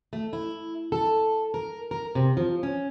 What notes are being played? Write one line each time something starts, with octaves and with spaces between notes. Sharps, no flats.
A3
E4
A4
A#4
A#4
C3
F3
C#4